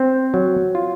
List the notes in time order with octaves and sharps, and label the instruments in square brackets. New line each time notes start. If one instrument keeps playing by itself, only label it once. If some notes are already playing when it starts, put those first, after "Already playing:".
Already playing: [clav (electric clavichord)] C4
F#3
F4